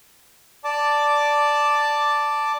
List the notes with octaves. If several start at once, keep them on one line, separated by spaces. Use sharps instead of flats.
D5 A5 D6